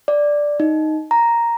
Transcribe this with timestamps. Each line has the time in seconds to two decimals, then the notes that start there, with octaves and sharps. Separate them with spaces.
0.08 D5
0.60 D#4
1.11 A#5